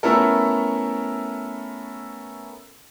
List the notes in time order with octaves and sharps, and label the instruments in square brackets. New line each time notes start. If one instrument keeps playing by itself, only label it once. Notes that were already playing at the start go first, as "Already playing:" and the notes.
[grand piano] A3 B3 C#4 E4 A4 A#4